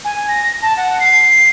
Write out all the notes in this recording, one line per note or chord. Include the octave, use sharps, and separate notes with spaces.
G#5
A#6
A5
F#5
C7